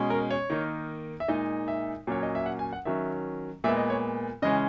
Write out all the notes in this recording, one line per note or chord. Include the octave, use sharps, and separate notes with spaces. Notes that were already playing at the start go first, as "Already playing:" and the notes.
Already playing: B2 G#3 C#4
A#4
C#5
D#3 A#3 D#4
E5
A#2 G#3 D#4 D#5
E5
A#2 F#3 C#4 C#5
D#5
E5
F#5
G#5
F#5
D#3 F#3 C#4 E5
A#2 G#3 B3 E5
D#5
C#5
C#3 E3 G#3 C#4 D#5